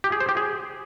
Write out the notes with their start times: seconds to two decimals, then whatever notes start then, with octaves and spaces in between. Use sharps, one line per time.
0.04 G4
0.12 G#4
0.20 C5
0.29 G4
0.37 G#4